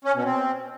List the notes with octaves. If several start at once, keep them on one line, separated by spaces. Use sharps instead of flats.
C#4
B2
C4